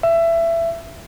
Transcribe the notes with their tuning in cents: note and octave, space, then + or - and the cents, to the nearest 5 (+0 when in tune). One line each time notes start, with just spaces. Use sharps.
E5 +20